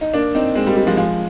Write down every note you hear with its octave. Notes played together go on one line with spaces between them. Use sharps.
D#4
A#3 D4
C4 D#4
G#3 C4
G3 A#3
G3
F3 G#3
F3 G#3